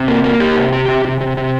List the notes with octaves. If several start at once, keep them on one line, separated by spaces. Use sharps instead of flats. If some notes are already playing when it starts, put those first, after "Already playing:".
Already playing: C3
A#3
A#3
G4
C3
G4
C3
C3
C3
C3